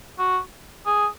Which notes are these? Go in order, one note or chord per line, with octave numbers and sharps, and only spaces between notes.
F#4
G#4